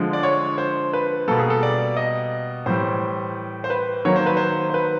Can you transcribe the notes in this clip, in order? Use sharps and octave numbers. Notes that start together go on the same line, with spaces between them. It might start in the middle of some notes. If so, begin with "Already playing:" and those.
Already playing: D3 F3 G#3
D5
C#5
C5
B4
B2 G3 A#3 A4
G#4
A4
D5
D#5
A2 E3 G3 C5
C5
B4
D#3 F#3 A#3 C#5
C5
B4
C5
C5
B4